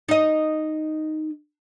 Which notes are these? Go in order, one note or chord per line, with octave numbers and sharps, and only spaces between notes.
D#4 D#5